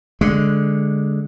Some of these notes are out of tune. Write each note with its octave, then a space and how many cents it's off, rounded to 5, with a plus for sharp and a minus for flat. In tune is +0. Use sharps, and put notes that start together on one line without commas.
D3 -5 G#3 +0